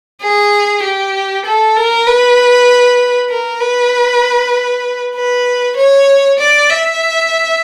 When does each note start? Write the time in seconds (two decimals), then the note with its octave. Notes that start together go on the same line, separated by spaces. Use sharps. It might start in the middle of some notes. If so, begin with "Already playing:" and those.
0.22 G#4
0.83 G4
1.45 A4
1.76 A#4
2.07 B4
3.30 A#4
3.61 B4
5.15 B4
5.76 C#5
6.39 D5
6.69 E5